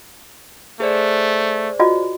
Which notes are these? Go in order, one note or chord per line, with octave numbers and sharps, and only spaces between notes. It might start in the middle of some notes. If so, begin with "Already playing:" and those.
A3 G#4 C5 D5
F4 F#4 D#5